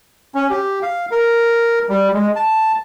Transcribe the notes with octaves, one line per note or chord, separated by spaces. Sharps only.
C#4
G4
F5
A#4
G3
G#3
A5